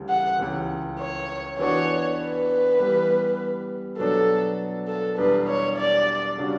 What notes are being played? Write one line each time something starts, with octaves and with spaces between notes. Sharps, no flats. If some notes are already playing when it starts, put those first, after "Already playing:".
Already playing: D2 C#3 E3 G3
F#5
C#2 C#3 E3
C#5
E3 B3 D4 F#4 C#5
B4
E3 G3 B3
B2 F#3 B3 D4 A4
A4
E2 B2 G3 D4 B4
C#5
D5
C#3 G3 D4 F#4